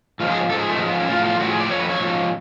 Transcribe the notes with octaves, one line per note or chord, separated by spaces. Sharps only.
G#2 F3 F4
G#4
G#2 F3 A4
G#4
A3
G#2 F3 G#3
B3
C#4
A2 F3 F4
F4
A2 F3 F#4
G#4
D5
F2 F3 C#5
B4
C#5
G#2 F3